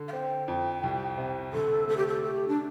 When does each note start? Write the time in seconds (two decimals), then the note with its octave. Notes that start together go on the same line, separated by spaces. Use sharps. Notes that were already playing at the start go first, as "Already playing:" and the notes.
Already playing: D3
0.08 F5
0.13 C4 G5
0.48 F2
0.83 C2
1.18 C3
1.53 D3 A4
1.88 A3 A4
1.97 G4
2.07 A4
2.23 A3 G4
2.48 D4